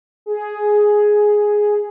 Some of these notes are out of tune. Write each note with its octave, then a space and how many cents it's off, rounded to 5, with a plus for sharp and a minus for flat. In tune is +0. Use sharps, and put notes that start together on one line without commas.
G#4 +5